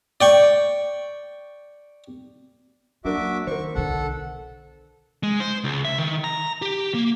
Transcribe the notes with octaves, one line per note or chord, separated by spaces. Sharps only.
D5 G5 C#6
F#3 A#3 D4 F#4 A#4 E5 D6
D#3 A#4 C5 C#6
B1 D3 A4 F#5
G#3
C5
C#2
E5
D#3
A#5
G4
A#3